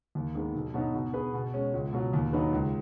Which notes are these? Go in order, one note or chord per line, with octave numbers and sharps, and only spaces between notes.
D#2
D#3 G#3 B3
B1
B2 F#3 B3 D#4
B2
B3 G#4 B4
B2
G#3 C#4
C#2
B2 F#3
D#2
D#3 F#3 D#4 B4
C#2